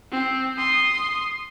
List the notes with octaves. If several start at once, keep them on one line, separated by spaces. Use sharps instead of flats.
C4
C6 D#6